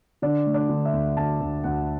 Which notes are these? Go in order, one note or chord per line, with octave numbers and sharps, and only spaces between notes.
D3 D4
A3
D4
D3
E5
D2
D2 A5
D2
D2 F#5